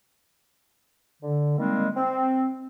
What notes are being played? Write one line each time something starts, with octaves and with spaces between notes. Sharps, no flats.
D3
D#3 G3 G#3 A#3 C4
C4